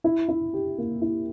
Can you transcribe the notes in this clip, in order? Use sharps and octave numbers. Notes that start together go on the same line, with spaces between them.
E4
E4
G4
A#3
E4